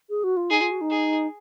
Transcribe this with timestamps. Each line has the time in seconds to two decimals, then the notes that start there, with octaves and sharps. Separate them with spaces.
0.09 G#4
0.24 F#4
0.37 F4
0.50 D#4 G#4
0.61 F4
0.71 F#4
0.81 D#4
0.90 G#4